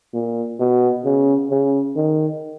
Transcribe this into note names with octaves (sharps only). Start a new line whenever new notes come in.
A#2
B2
C#3
C#3
D#3